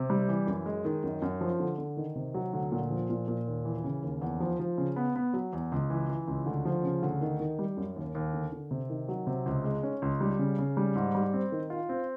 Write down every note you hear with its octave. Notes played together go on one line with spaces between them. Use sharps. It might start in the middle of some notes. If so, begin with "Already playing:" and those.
Already playing: C3
G3
E3
F#2
G#3
D#3
F#2
F#2
F3
D3
D3
D#3
C3
F#3
D2
A#2
F3
A#2
A#2
D#2
E3
C#3
D#2
E2
F3
F3
C#3
B3
B3
F#3
E2
C#2
E3
E3
C#2
D2
F3
C#3
D2
D#3
D#3
G3
F#2
D#2
D#2
D3
D3
C3
D#3
F#3
C3
C#2
G#3
C#4
C#2
G3
C#3
C#3
G3
G#2
G3
C4
D#3
F4
C4